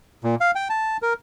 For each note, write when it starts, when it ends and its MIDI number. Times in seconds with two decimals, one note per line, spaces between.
0.24 0.35 46
0.41 0.51 77
0.55 0.68 79
0.69 0.97 81
1.02 1.13 70